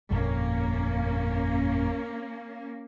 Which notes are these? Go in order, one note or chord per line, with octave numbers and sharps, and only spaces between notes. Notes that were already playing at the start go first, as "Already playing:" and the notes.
G1 F2 A#2 A#3 C#4